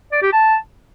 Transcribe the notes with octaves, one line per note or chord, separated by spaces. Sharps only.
D5
G4
A5